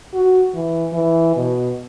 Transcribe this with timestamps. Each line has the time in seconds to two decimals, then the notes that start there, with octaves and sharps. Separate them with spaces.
0.14 F#4
0.54 E3
0.93 E3
1.36 B2